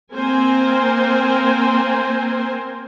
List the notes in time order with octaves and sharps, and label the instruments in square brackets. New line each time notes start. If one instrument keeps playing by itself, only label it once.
[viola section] A#3 C4 A#4 C5 G#5